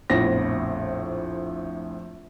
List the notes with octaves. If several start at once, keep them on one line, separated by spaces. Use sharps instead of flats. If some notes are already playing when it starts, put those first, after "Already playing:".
A#1 F2 A2 B3 A#6